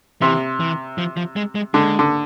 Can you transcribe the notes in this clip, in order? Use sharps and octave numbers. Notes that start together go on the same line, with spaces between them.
C3 E3
E3
F3
F3
G#3
G#3
D3 G#3
D3